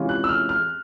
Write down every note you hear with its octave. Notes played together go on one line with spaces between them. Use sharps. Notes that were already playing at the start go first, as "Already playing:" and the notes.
Already playing: C3 E3 G#3 C#4 F4
F#6
E6
F6
F6